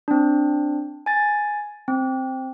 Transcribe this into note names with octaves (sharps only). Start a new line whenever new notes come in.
C4 D4
G#5 A6
C4